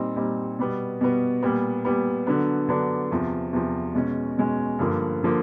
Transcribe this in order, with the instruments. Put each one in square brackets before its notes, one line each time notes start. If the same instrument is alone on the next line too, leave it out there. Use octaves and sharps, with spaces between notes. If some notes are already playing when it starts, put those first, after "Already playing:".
Already playing: [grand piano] A#2 G3 C4 D#4
A#2 G3 C4 D#4
B2 G3 B3
B2 G3 B3
A#2 G3 B3
A#2 G3 B3
D3 F#3 B3 D4
D3 F#3 B3 D4
E2 C3 F3
E2 C3 F3
B2 G#3 C#4
B2 G#3 C#4
G2 D3 F3 A#3
D3 F3 A#3